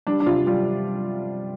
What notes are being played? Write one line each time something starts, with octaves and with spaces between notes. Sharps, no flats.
G3 D4
D4
C3 F4
G3 F4